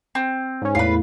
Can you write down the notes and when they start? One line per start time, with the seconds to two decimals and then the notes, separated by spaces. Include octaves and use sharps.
0.15 C4
0.62 G#2 C#4
0.75 E2 A2 F4 B4